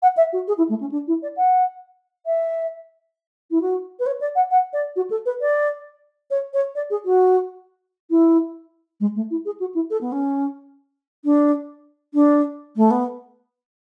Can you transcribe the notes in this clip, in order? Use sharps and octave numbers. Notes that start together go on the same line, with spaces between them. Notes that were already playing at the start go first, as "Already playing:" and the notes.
F#5
E5
F#4
G#4
E4
A3
C#4
D4
E4
D5
F#5
E5
E4
F#4
B4
C#5
D5
F#5
F#5
D5
F#4
A4
B4
D5
C#5
C#5
D5
G#4
F#4
E4
G#3
A3
E4
G#4
F#4
E4
A4
B3
C#4
D4
D4
A3
B3